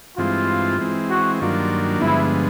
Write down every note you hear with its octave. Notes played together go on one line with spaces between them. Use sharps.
G2 E3 G#3 C4 F4
E3 G#3 C4
F#4
G2 D#3 F#3 A#3 D4 F4
G2 D3 F3 G#3 B3 E4